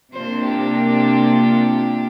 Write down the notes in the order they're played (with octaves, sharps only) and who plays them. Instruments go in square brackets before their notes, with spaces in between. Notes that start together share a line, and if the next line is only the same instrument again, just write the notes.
[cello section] C3 A#3 D4 F4 [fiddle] C5
[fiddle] G4